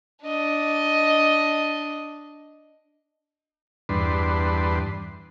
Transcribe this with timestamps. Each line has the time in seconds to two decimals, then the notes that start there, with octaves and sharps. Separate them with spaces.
0.23 D4 D#5
3.89 E2 G2 D4 B4 C6